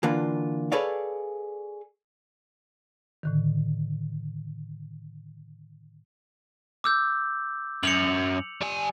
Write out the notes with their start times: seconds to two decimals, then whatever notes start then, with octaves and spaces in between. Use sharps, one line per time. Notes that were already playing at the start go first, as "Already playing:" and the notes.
0.03 D3 E3 A#3 D4 F4
0.72 G#4 A4 B4 C#5 D5 F5
3.23 A2 D3 D#3
6.84 D6 E6 G6
7.83 F#2 C#7 F7 F#7
8.61 G3 G#5